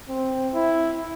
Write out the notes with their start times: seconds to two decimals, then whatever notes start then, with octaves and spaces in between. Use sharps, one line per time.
0.09 C4
0.54 E4